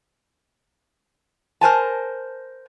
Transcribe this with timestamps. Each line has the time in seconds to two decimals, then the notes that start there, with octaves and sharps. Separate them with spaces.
1.61 A#4 C5 G#5 A5